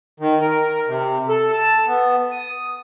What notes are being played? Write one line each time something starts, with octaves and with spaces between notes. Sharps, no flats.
D#3
A#4
C3
A4
A5
B3
D#6